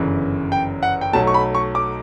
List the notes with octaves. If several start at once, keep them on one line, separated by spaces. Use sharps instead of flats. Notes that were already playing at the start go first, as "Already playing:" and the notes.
Already playing: G1 F#2 C#3 E3
G5
F#5
G5
B1 B2 F#3 A3 A5
C#6
B5
C#6
D6